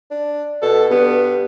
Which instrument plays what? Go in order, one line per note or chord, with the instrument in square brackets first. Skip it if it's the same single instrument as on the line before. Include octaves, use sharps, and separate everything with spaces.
[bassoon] D4
[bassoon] B2 [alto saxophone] A4
[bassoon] G2 [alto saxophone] B3